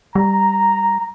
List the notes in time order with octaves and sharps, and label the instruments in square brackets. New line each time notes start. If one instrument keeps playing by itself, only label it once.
[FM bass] G3 [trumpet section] A#5